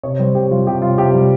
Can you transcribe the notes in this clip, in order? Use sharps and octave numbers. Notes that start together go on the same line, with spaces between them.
C3 C#5
G3 C5
C3 G4
G3 F4
C3 G4
G3 F4
C3 G4
G3